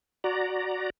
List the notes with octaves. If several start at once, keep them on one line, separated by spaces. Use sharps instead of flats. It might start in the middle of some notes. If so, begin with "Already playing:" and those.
F#4 D5 A#5